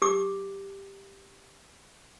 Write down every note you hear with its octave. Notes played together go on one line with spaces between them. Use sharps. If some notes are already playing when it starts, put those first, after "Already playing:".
G4 D6